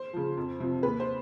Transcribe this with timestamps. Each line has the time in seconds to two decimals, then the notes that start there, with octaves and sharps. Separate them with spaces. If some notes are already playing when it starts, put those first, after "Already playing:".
Already playing: C5
0.13 C#3 F3
0.37 F2
0.60 C3 F3
0.83 D#2 B4
1.00 C5